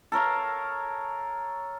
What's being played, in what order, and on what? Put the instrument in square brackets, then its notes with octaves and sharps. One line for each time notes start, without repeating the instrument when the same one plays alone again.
[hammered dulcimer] A4 A#4 C#5 F5